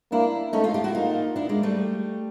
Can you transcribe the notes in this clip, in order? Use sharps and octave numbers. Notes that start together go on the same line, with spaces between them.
A#3 D4 E4
A3 C#4 D#4
D#4 F4
F4 G4
E4 F#4
A#3 D#4 F4
D4 E4
G#3 A#3
G3 A3